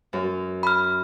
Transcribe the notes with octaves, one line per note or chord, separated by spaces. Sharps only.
F#2
B5 F6